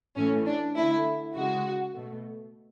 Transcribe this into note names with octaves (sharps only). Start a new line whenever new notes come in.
A2 E3 A3 C#4
D4
D3 A3 E4
C#3 G#3 F#4
B2 A3